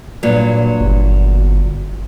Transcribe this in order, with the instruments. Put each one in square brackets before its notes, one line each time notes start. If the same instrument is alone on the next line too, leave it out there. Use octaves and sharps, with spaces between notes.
[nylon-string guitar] G2 A#2 F#3
[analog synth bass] G1